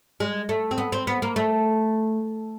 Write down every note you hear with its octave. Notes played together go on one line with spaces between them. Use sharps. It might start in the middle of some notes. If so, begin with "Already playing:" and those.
G#3
A3
C4
B3
C4
B3
A#3
A3